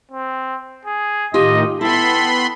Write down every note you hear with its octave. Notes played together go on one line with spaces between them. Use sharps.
C4
G#4
A2 D#3 D#4 F4 G4 D#5
B3 E4 A4 G5 B5 C6